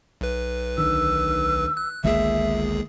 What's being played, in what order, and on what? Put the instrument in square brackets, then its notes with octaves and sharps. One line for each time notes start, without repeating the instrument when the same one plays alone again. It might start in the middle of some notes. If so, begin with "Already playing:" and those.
[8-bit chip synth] B1 B4
[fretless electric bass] D2 D3 D#3 [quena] E6
[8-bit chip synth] F#6
[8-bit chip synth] G1 C#2 G#4 [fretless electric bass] D#3 G#3 A#3 [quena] E5